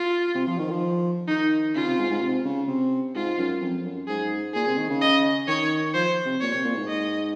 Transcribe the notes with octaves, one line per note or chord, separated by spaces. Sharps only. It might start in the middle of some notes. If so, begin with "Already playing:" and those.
Already playing: F4
C3
F3
D#3
F3
D#3 D#4
C#3 F4
C3
G#2
G#2
C3
C#3
C3
G#2 F4
F#2
F2
F#2
G#2 G#4
A#2 G#4
C3
D#3
C#3
D#5
D#3 C#5
F3 C5
C3
A#2 C#5
C3
A#2
G#2
D#5